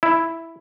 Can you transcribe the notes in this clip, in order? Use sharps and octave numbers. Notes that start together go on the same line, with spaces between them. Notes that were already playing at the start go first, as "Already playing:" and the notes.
E4